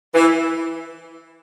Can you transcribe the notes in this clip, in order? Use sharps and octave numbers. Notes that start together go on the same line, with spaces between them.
E3